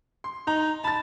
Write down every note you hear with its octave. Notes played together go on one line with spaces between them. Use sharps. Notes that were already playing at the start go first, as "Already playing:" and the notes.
C6
D#4 A#5
A5 B5 A6